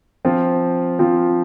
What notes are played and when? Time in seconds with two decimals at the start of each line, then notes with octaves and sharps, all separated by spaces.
0.25 F3 C4 F4
0.99 F3 C4 F4